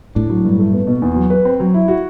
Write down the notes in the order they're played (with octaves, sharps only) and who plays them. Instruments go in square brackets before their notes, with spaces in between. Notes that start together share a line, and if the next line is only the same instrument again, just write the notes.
[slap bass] A2 [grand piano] D4
[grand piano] F#3
G2
A3
B3
B2
E2
F#3
B4
C4
F#3
E4
F#4